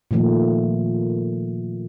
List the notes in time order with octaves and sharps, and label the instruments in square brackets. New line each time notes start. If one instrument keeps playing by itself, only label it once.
[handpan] A#2 D#3 F3 A3 A#3